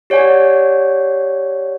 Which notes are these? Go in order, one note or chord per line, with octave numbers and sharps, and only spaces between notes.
G4 C#5 D5 F#5 G#5